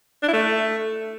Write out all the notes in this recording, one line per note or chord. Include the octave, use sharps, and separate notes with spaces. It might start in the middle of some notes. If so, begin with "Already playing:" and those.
D4
E4
A3